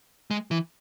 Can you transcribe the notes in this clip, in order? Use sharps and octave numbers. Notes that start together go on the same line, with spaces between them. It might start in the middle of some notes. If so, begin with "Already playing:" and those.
G#3
E3